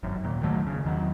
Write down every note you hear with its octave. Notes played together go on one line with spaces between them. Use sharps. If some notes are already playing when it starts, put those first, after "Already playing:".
G#1 F#2
D#2 A#2
C#2 D#3 F#3 A3
F1 C#3
E2 D#3 F#3